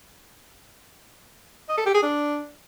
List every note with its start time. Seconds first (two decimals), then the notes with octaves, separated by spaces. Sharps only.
1.69 D#5
1.77 A4
1.86 G4
1.94 G#4
2.03 D4